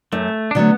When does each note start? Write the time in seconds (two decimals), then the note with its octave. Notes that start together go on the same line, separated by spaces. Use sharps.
0.12 F#2 A3
0.51 D4
0.55 D3 F#3 A3 B3